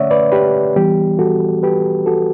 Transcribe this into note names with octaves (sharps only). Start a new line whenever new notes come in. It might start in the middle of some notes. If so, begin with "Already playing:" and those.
Already playing: D3 A3 C#4 C#5 D5 E5 F#5
B4 D5
G4 B4
E3 G3 B3 G4
F#4 A4
G4 B4
F#4 A4